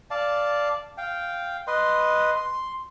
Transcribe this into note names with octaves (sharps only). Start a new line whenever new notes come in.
D5 F5 A5
F5 G5
B4 D#5 C6
C6